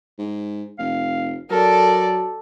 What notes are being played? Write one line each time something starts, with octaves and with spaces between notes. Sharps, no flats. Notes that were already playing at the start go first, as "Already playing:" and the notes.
G#2
F1 F5
F#3 A4 A#4 D5